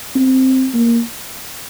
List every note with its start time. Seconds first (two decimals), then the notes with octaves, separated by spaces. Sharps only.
0.16 C4
0.74 A#3